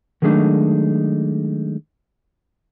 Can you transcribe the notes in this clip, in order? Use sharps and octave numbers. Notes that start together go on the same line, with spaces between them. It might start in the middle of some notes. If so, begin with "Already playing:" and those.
D#3 F#3 G#3 A3 D4 D#4